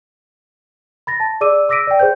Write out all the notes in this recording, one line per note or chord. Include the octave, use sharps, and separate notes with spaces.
B5 A6 A#6
A5
G#4 D5 D6 E6 D#7
D6 E6 A#6 B6 D7 D#7
D5 G5
G#4 B4 C5 G6